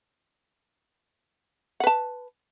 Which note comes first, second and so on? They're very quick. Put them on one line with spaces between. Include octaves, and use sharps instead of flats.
F#5 B4 A5